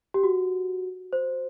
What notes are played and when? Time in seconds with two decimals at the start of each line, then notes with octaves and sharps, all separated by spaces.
0.14 G4
0.23 F#4
1.13 C5